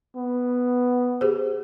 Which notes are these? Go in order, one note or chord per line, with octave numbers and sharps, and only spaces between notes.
B3
G4 G#4 C5